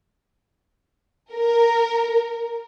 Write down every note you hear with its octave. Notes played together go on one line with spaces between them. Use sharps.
A#4